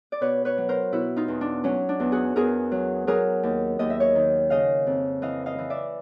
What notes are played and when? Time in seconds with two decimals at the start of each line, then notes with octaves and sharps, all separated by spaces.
0.12 D5
0.21 B2 B4 C#5
0.45 B4 C#5
0.58 F#3
0.69 A#4 C5
0.92 B2 E4 F#4
1.16 D#4 F4
1.28 E2
1.41 D4
1.64 F#3 C#4
1.89 D4
2.00 E2
2.12 F#4 G#4
2.36 E2 G#4 A#4
2.72 F#3
3.07 F#3 G#4 A#4
3.43 D#2
3.79 D#2 D#5
3.90 E5
4.00 C#5 D#5
4.15 D#3
4.50 C#3 D#5 F5
4.87 F2
5.22 E3 D#5 F5
5.46 D#5 F5
5.59 E3
5.70 D5 E5